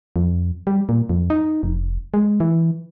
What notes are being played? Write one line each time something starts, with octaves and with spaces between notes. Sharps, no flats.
F2
G3
A#2
F2
D#4
F1
G#3
E3